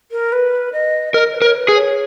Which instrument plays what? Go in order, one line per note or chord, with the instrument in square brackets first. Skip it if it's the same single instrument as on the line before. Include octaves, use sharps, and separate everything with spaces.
[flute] A#4
B4
D#5
[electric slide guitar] A#4 [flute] D#5
[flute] B4
[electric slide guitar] A#4
[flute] C#5
B4
[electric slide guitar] G#4
[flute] C#5